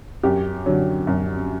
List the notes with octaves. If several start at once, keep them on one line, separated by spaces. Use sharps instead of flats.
F#2 G4
D3 F#3
F#2